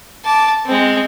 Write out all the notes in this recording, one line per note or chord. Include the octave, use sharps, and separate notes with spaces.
A5 D6
G#3 C4